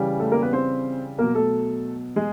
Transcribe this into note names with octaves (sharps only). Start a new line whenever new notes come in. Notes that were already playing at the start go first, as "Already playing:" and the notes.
Already playing: C#3 E3 G3
A3 A4
A#3 A#4
B3 B4
C4 C5
B2 F#3 A#3 A#4
A3 A4
G#3 G#4